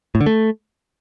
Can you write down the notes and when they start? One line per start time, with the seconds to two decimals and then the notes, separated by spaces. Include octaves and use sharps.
0.15 A2
0.21 D3
0.26 A3